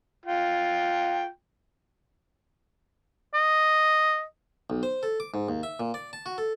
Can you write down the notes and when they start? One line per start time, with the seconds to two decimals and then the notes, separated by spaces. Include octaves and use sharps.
0.26 F4 G5
3.34 D#5
4.70 B1
4.83 C5
5.03 A4
5.20 D6
5.34 G#2
5.49 D#2
5.63 E5
5.80 A#2
5.94 D5
6.13 A5
6.26 F#4
6.38 A4